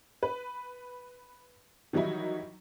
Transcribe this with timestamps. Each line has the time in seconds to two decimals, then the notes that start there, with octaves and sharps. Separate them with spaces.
0.23 B4
1.93 D#3 E3 F#3 G3 D#4 E4